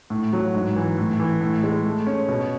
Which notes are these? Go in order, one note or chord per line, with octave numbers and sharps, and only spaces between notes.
A2
F#3
G#2
E3
A2
E3
A2
G#3
A3
C#4
B2